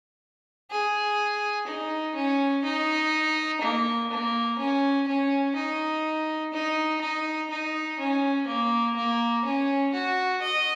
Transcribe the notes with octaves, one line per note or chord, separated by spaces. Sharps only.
G#4
D#4
C#4
D#4
A#3
A#3
C#4
C#4
D#4
D#4
D#4
D#4
C#4
A#3
A#3
C#4
F#4
D#5